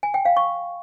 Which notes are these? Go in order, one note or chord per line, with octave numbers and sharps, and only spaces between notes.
G#5
G5
F5
C#6